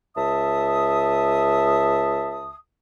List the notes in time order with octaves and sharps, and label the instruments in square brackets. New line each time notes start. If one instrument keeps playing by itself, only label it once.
[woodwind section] C#2 E5 A5 D#6